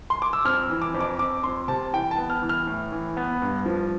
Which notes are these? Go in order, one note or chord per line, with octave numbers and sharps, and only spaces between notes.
C6
D6
E6
F2 F6
E3
D6
F2
D6
F2 D6
F2 C6
C3 A5
E3 G5
A5
B3
F6
E3
F6
A2
E3
B3
G2
F3